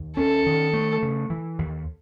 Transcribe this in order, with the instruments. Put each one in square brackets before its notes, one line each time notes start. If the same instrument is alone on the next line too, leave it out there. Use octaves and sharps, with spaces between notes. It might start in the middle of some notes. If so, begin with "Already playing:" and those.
Already playing: [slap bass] D#2
[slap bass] C#4 [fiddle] A4
[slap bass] D#3
A3
C#3
E3
D#2